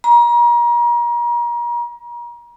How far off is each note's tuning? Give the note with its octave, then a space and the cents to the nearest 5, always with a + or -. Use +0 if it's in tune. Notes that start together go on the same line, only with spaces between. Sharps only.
A#5 +35